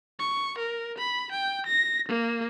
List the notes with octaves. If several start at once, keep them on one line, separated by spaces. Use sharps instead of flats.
C#6
A#4
B5
G5
A#6
A#3